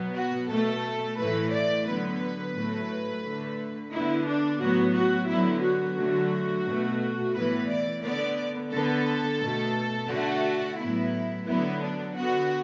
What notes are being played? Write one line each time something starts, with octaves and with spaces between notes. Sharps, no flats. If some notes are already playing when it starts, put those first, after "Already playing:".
Already playing: B2 F#3 B3
F#4
B2 A3 A4
A2 E3 A3 B4
D5
D3 F#3 B3 B4
A2 F#3 A3
D3 A3
D3 B3 E4
D4
A2 F#3 B3 F#4
F#4
D3 F#3 B3 E4
F#4
D3 F#3 A3
B2 A3
A2 E3 B3 B4
D5
D3 B3 D5
D3 B3 A4
B2 A3
D3 A3 F#4
A2 F#3 B3 E4
D3 F#3 B3 E4
D4
D3 B3 F#4